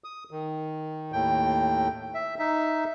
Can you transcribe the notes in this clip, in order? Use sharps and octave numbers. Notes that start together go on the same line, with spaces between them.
D#6
D#3
D#2 A2 G5
E5
D#4 E5